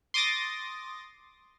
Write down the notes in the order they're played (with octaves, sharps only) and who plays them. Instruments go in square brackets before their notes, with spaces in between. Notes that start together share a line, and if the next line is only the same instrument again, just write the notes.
[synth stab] C6 D6 D#6 A6 A#6